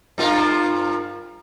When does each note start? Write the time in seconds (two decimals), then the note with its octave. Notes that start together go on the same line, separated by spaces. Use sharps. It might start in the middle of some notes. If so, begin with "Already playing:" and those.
0.18 G2 F4 A#4